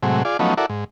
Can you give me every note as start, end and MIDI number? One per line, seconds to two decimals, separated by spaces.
0.03 0.23 45
0.03 0.23 48
0.03 0.23 54
0.03 0.23 56
0.25 0.37 65
0.25 0.37 68
0.25 0.37 74
0.39 0.54 53
0.39 0.54 54
0.39 0.54 57
0.39 0.54 59
0.39 0.54 61
0.39 0.54 63
0.57 0.66 64
0.57 0.66 66
0.57 0.66 69
0.57 0.66 70
0.57 0.66 74
0.69 0.84 44